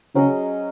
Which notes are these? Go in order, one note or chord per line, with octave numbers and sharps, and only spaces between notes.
C#3 F#3 C#4 G#4 D#5